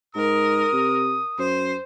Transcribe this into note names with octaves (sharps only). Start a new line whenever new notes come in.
G#2 A#4 D#6
C3
F#2 C5